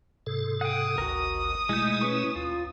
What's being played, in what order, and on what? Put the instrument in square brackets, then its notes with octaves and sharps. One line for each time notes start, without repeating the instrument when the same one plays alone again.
[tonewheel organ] G#2 C3 A4
[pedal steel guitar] F#5 G5 [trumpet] D#6
[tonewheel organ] G#1 D2 [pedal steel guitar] F#4 A#4
[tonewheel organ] B2 A3 E4 [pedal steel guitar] G#3 G6
[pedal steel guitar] C#4 B4 C#6
[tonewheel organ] D#2 [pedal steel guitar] F4